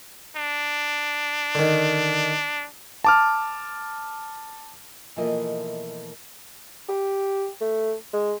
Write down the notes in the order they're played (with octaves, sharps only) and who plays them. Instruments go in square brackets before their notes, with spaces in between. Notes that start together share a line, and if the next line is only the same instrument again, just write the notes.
[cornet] D4
[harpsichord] D3 D#3
[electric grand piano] A5 D6 F6
[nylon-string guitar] B2 E3 F3 A3 A#3 D#5
[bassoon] G4
A3
G#3